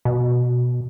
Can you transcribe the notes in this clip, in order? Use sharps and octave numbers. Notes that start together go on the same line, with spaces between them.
B2